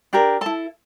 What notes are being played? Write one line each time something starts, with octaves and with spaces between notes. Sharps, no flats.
D4 G4 A#4
E4 A4 A5